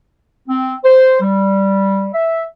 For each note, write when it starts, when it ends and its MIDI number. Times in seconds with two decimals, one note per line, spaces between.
0.47 0.74 60
0.84 1.18 72
1.21 2.07 55
2.13 2.42 76